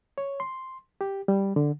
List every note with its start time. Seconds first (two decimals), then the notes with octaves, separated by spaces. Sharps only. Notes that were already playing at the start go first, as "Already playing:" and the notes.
0.18 C#5
0.40 C6
1.01 G4
1.28 G3
1.56 D3